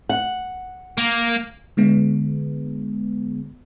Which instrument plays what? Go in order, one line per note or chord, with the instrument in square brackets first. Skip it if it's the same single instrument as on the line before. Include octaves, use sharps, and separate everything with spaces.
[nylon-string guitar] F#5
[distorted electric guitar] A#3
[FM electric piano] D3 G#3 B3